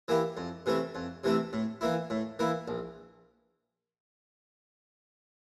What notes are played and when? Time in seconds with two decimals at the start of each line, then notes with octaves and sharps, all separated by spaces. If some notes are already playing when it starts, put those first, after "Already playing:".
0.08 E3 A#3 E4 G4
0.37 F2
0.66 C3 E3 A3 C4
0.95 F2
1.24 C3 E3 A3 C4
1.53 A2
1.81 E3 A#3 E4
2.10 A2
2.39 E3 A#3 E4
2.68 A#1